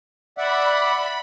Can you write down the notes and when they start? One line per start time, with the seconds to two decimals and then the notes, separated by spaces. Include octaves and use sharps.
0.38 D5 E5 F#5 B5